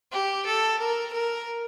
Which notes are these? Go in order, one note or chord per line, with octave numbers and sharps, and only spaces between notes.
G4
A4
A#4
A#4